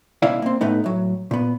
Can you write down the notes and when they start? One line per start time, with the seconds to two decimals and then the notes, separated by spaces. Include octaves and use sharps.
0.22 C#2 B2 E4 D5 F5
0.42 A#3 C4
0.61 A2 A3 B3 D#4
0.84 A2 F#3
1.31 A#2 B3